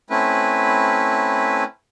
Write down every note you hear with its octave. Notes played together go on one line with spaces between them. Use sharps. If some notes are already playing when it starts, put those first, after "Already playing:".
A3 C4 C#4 E4 B4